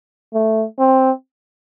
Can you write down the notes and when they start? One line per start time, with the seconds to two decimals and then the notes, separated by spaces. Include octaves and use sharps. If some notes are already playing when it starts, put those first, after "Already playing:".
0.34 A3
0.79 C4